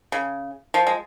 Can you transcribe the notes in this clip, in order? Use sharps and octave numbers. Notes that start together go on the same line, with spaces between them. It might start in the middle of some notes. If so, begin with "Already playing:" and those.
C#3
F3
G#3